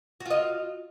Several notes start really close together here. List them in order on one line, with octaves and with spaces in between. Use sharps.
F#4 F4 D#5